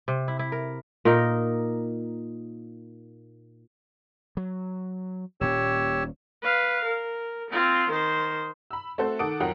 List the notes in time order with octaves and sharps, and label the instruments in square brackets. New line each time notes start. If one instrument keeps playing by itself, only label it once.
[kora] C3
E4
E4
A#4
A#2 D#4 A#4
[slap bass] F#3
[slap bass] D#1 A#2 C#4 [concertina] G4 C#5 E6
[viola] B4 F5
A#4
C4 F4
D#3 C5
[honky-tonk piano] B5 E6
A3 C4 F#4 A4 C5
D#3 A4 F#5 D6 D#6 D7
F2 F3 F#3 A#4 F#5 G5